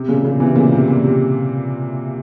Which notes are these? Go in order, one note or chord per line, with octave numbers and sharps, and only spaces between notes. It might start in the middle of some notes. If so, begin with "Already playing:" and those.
Already playing: C3
A#2 C#3
A#2 C#3
C3 E3
A#2 C#3
C3
A#2
C3